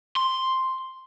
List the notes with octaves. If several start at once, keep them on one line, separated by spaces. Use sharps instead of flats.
C6